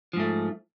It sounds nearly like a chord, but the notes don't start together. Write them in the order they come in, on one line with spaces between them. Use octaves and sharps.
F3 G#2 A3